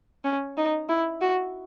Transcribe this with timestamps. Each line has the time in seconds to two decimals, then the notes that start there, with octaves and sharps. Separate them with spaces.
0.24 C#4
0.57 D#4
0.89 E4
1.21 F#4